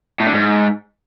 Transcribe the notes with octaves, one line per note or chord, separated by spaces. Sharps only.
A2
D3
G#2